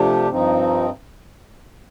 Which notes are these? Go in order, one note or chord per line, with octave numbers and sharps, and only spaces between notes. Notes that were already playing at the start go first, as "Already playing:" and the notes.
Already playing: C3 F3 A3 D4 G4
G2 F3 C4 D#4